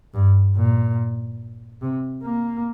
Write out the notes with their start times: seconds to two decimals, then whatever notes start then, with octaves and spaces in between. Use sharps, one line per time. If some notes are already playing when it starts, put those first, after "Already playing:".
0.14 G2
0.57 A#2
1.81 C3
2.22 A#3